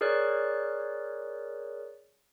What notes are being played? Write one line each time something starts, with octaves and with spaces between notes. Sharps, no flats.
G#4 A#4 C#5 D5 F#6